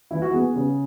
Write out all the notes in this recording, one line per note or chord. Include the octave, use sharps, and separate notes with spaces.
E3 E4
F#4
B3 G#4
C#3